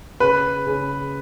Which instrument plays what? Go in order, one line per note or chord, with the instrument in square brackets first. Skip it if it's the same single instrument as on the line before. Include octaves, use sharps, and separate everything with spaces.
[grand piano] C#3 B4
C#3